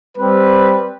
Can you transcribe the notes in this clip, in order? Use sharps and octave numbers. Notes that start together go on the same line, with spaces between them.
G3 C4 B4